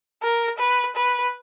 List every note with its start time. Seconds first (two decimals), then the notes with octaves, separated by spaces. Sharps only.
0.23 A#4
0.59 B4
0.96 B4